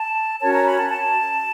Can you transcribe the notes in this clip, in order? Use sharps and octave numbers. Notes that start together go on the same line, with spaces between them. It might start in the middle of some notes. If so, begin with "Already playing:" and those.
Already playing: A5
C#4 F#4 A#4 C#5 A5
A#5
B5
A5
A5